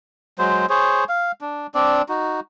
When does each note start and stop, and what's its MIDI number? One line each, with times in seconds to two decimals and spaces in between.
0.39 0.66 54
0.39 0.66 56
0.39 0.66 72
0.70 1.04 68
0.70 1.04 72
0.70 1.04 73
1.09 1.32 77
1.41 1.67 62
1.75 2.02 60
1.75 2.02 62
1.75 2.02 74
2.09 2.40 63
2.09 2.40 66